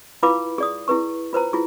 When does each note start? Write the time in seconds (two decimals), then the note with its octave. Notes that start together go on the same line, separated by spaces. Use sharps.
0.23 E4 F4 B4 F5 B5 D6
0.58 G#4 D5 D#6
0.88 E4 G#4 B4 C#6
1.33 F4 B4 C5 A#5
1.53 E4 F4 G#4